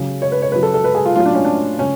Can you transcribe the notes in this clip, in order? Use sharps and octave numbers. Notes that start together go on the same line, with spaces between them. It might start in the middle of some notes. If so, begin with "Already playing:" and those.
Already playing: C#3 F#3
C#5
B4
C#5
C#3 F#3 B4
A4
A4
B4
G#4
F4
A2 F#3 F4
D4
C#4
D4
C#3 C#4